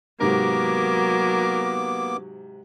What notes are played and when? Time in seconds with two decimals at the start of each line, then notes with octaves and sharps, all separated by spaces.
0.21 G#2 C3 F#3 A#3 B3 A#4 D6